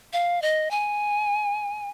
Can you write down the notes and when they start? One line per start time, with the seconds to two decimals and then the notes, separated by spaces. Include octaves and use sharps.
0.13 F5
0.42 D#5
0.71 G#5